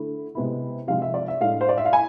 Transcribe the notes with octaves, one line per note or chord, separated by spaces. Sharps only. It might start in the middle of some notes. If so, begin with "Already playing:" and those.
Already playing: D3 A3 E4
C3 G#3 B3 E4
C3 F3 G#3 C4 F5
E5
D5
E5
A2 G#3 D4 F5
C5
D5
E5
F5
E4 G#5